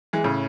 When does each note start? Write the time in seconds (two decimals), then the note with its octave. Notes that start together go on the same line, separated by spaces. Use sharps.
0.13 E3 G#3
0.24 A2 C#3